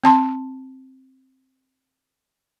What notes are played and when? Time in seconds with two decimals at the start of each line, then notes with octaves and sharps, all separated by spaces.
0.04 C4 A5 C6